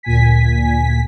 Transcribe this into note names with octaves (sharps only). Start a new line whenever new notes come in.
D2 A#2 G#5 B6